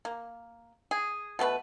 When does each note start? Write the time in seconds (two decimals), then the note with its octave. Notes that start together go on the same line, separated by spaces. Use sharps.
0.05 A#3
0.91 G#4
1.39 B2 A3 C#4 B4